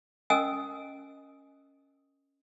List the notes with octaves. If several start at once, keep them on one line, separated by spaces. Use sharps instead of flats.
C#4 A#4 D#5 G#5 D#6 E6